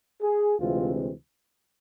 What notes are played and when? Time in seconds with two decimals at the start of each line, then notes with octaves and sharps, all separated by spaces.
0.22 G#4
0.59 D2 C3 E3 G#3 C4 F4